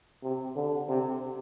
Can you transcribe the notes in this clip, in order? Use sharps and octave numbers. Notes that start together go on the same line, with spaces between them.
C3
D3
C3